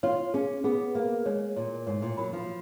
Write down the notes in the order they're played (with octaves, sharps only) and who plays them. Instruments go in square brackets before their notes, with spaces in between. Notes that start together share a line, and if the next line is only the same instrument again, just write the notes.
[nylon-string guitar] F4 [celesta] C#5
[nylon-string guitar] C#4 [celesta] G#4
[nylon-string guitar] B3 [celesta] G#4
[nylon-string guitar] A#3 [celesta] G#4
[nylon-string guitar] G#3 [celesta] C#5
[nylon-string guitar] A#2 [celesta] C#5
[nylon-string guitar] G#2 [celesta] C#5
[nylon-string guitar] A#2
[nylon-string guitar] F#3 [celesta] B5
[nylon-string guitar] F3